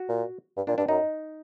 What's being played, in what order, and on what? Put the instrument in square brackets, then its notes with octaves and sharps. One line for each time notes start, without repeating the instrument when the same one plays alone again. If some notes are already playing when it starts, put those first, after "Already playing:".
Already playing: [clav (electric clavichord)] F#4
[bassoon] A#2
G2
[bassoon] A#2 [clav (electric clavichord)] D4
[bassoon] G2 [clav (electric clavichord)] D4
[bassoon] F#2 [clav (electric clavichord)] D#4